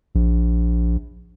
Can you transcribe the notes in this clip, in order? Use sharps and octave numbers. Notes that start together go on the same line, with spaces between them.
A#1